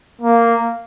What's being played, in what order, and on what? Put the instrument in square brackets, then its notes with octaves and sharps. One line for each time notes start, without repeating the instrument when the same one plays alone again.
[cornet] A#3